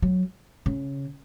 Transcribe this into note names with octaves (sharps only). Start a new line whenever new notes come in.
F#3
C#3